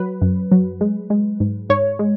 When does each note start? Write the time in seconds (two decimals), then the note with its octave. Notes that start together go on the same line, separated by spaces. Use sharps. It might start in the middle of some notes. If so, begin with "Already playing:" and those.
Already playing: F#3 B4
0.22 F#2
0.51 F#3
0.81 G#3
1.10 G#3
1.40 G#2
1.70 G#2 C#5
1.99 G#3